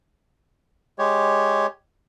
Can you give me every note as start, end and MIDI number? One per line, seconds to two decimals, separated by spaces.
0.99 1.66 56
0.99 1.66 67
0.99 1.66 73